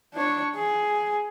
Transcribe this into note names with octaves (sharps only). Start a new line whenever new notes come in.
D4 C#5
G#4